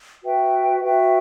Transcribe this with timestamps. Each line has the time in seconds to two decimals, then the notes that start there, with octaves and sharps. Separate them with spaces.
0.23 F#4 B4 E5 G5
0.84 F#4 B4 E5 G5